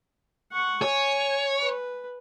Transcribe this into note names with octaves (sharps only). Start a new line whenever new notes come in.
F#5 C#6
C#5 G#5
B4